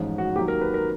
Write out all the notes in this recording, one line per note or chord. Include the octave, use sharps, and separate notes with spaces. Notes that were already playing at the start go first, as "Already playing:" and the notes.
Already playing: A1 G#2 F3 G#3 C#4
F#4
D#2 D#3 F#3 G4
A#4
B4
A#4